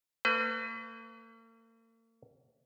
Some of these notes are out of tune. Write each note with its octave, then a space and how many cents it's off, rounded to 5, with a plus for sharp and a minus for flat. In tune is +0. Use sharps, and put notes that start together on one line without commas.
A#3 -45 B4 +40